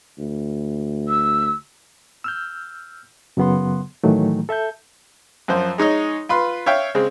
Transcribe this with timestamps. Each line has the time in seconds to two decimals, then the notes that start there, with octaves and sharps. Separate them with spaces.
0.18 D2
1.09 E6
2.24 E6 F6 G6
3.37 F#2 C#3 F#3 B3 F#5 C6
4.04 A2 D#3 E3 F#3 A3
4.49 A4 E5 A5 G6
5.48 F#2 F3 C5
5.78 G#3 D#4 C#5 D#5
6.29 F4 B4 C6
6.66 C#5 E5 F5 G5
6.95 C#3 G#3 C4